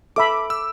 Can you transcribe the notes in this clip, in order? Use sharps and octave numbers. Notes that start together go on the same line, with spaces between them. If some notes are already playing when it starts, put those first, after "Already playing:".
A4 E5 B5 D6
E6